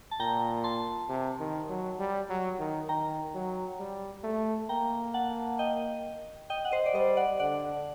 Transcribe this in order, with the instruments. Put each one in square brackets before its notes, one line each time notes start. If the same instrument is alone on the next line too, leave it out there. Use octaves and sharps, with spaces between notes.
[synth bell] A5
[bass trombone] A#2 [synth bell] G5 A#5
[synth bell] A5 C6
[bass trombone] C3
D#3
F#3
G3
F#3
D#3
[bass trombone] D#3 [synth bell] G5 A#5
[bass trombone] F#3
G3
A3
[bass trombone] A#3 [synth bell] G5 A#5
[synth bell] F#5 A5
D#5 G5
D#5 G5
F#5
C5 D#5
D5
[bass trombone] G3 [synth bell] C5 D#5
[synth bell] D5 F#5
[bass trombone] D3 [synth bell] D5 F#5